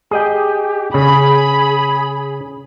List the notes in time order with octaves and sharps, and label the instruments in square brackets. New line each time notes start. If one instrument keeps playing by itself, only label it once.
[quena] G4 [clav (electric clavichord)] G#4 D#5 G5
[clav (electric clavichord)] C#3 [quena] G#4 [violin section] B5